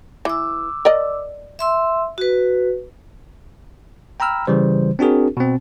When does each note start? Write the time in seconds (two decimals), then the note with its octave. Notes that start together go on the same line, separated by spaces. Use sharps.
0.25 E3 D6 E6
0.85 A#4 D5 D#5
1.59 E5 C6 E6
2.18 F#4 B4
4.20 G5 A#5 B5 E6 F6
4.47 C#3 E3 G3 C5
4.99 C4 D4 F#4 G#4 A#4
5.37 B2 C4